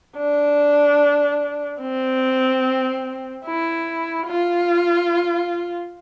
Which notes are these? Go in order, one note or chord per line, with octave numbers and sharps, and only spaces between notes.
D4
C4
E4
F4